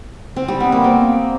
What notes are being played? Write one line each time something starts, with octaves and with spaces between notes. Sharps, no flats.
C4
G3
B3
A#3
C4